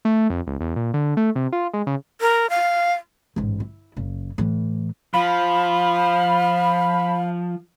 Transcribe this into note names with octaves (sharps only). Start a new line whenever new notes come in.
A3
F2
C#2
E2
A#2
D3
A3
C3
F4
G#3
C#3
A#4
F5
A1 G#2
E4
F#1 C#3
A2 E3
F3 F5 B5